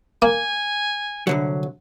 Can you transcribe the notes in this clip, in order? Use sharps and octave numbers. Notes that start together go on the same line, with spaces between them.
A#3 G#5
C2 D3 F#3